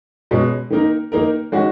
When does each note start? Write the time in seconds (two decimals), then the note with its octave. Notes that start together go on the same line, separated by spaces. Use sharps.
0.31 B2 G#3 C#4
0.70 D#3 A#3 D#4 A#4
1.12 D#3 A#3 D#4 A#4
1.52 D#3 G#3 C#4 F#4